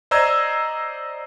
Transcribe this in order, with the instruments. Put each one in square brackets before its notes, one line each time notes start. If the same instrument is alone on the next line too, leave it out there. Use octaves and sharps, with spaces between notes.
[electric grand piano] C5 D5 D#5 A#5 E6 G#6